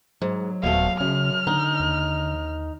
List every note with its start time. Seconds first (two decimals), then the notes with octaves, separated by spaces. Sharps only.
0.22 G#2 F#3
0.63 D#1 B2 A3 F5
1.00 F#2 C#3 F6
1.47 D3 D#4
1.80 D#2